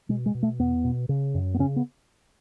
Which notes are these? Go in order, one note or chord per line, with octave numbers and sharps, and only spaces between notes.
B2 G#3
G#3
B2
A3
E2 B3
B2
C#3
F#2
B3
C#3 C#4
B3